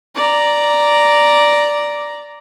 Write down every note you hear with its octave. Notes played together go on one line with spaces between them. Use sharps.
D5 A#5